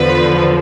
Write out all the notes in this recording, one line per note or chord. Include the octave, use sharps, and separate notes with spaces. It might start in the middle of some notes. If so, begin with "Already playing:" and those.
Already playing: E2 D3 F3 B4